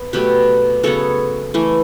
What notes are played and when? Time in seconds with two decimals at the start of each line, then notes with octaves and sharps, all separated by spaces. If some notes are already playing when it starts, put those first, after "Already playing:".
Already playing: B3
0.13 B2 F#3 A3 G4 B4
0.83 C#3 F#3 B3 A4 C#5
1.54 E3 A3